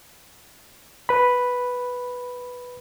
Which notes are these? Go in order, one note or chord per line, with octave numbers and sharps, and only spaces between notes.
B4 B5